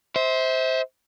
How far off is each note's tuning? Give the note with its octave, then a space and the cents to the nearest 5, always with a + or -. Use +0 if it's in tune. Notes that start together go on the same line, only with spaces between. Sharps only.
C5 +0 E5 -35